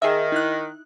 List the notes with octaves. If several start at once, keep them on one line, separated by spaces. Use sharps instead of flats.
D#3 G#4 E5
D#4 E4 F#6